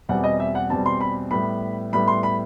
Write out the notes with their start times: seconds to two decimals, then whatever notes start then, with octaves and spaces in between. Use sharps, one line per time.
0.09 E2 B2 G3 C4 F#5
0.24 D#5
0.40 E5
0.55 F#5
0.70 E2 B2 G3 C4 A5
0.86 C6
1.01 B5
1.31 A2 G3 B3 B5
1.93 A2 G3 B3 B5
2.08 C6
2.23 B5